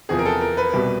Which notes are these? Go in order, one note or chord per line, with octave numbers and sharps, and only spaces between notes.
E2 C3 F3 G#4
A#4
A4
A#4
B4
C2 B2 G3